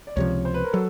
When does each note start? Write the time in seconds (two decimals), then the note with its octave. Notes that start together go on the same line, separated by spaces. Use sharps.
0.07 D5
0.16 C#2 C3 F3 C#5
0.45 C5
0.54 B4
0.64 A#4
0.73 F#3 A4